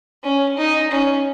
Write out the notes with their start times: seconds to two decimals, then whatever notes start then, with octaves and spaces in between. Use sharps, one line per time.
0.23 C#4
0.57 D#4
0.91 C#4